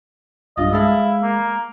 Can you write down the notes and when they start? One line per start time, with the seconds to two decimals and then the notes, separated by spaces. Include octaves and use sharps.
0.57 B1 G2 F4 D#5
0.73 G#3 E4 A4 F5
1.22 A#3